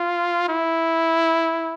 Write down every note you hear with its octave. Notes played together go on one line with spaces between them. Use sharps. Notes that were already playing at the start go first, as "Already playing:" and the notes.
Already playing: F4
E4